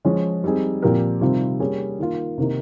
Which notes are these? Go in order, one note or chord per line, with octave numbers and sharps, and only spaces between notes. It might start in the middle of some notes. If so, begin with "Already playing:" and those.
F3 G#3 C#4
G3 C4 D#4 G#4
A#2 F3 C4 G4 A#4
C3 D#3 G3 C4 F4
G3 A#3 C#4 G#4
D#3 A#3 F4
C3 D#3 A#3 D#4